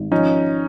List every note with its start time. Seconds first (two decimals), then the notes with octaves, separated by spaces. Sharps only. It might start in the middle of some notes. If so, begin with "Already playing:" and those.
Already playing: G#1
0.11 F3 C#4 D#4